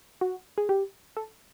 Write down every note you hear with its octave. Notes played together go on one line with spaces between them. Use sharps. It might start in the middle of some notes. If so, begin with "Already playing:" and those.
F#4
G#4
G4
A4